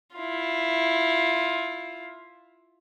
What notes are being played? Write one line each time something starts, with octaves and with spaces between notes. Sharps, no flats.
E4 F4